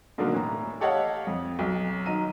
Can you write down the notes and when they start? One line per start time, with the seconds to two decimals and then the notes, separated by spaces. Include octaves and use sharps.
0.18 B2 D3 D#3 F#3 A#3
0.33 A2 E3 A#5
0.81 G4 A4 C#5 D#5 F5 F#5
1.27 F2
1.59 B1 F#3
2.06 D#3 F#3 D#5 A#5 D#7